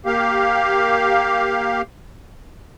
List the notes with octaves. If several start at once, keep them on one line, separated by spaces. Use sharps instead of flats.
A#3 G4 F5